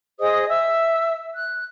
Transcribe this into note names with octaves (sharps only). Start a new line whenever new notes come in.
G#4 C5 D#5 D#6
E5 E6
F#6